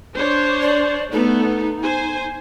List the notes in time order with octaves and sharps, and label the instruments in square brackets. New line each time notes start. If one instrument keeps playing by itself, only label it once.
[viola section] D4 C5 C#5
[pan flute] D5
[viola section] A3 B3 A4 [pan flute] D#4
[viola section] C5 G#5